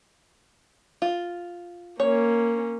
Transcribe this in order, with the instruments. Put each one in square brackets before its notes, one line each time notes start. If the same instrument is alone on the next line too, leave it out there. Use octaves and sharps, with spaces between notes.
[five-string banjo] F4
[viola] A#3 C#4 [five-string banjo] C#5